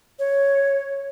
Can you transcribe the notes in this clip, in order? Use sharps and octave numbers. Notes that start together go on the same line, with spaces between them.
C#5